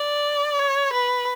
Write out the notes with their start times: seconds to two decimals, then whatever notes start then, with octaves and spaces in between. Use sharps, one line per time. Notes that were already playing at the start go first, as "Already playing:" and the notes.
Already playing: D5
0.59 C#5
0.93 B4